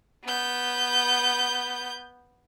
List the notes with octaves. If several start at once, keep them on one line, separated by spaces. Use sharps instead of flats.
B3 G6